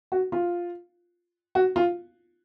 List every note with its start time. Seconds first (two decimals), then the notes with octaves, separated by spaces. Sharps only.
0.12 F#4
0.32 F4
1.55 F#4
1.76 F4